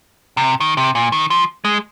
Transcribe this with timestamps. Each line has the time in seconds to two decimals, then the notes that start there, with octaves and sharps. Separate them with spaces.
0.37 C3
0.60 D#3
0.77 C3
0.95 A#2
1.12 D#3
1.30 F3
1.65 G#3